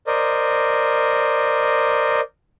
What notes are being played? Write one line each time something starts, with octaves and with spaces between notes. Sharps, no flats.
A#4 C5 D5 D#5